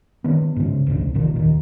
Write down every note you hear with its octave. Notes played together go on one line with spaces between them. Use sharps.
D#3 B3
G#2 C#3
A1 D2 G#2 C#3
C2
F1 A#2 D#3
D#2 D#3